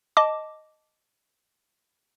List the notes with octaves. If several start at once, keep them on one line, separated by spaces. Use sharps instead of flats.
D#5 A5 D6